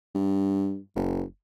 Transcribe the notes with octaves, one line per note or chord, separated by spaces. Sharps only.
G2
F#1